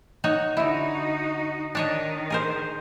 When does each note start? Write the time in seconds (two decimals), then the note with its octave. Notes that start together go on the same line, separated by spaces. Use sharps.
0.24 D#4 F#4 C#5
0.57 D3 D#4 E4 F#4
1.75 D#3 D4 C#5 D#5
2.30 G#4 A#4 C5